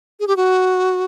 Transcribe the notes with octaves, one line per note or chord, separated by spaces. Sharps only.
G#4
G4
F#4